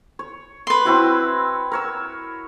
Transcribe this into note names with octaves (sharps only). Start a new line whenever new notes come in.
C#5
B4 C6
C4 E4 F#4
A#4 C#5 E6